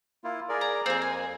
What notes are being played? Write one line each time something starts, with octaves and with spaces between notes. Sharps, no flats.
A#3 E4 F4
G#4 A#4 D5
A#5
F2 A#3 C4 G#4
G#5